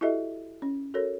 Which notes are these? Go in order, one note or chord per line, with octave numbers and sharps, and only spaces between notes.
E4 F#4 G4 A4 D#5 E5
C#4
F#4 A4 A#4 C#5